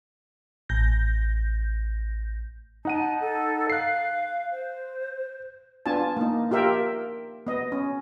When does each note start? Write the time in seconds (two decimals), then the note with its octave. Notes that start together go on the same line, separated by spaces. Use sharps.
0.69 A1 G6 A#6
2.85 D#4 F#5 A5 D#7
3.21 A4
3.70 F5 F#6 C7
4.52 C5
5.86 B3 D4 F4 G#5 A5
6.17 A#3 D#4
6.51 F4 G4 A#4 E5 G5
7.47 B3 D#5
7.72 C#4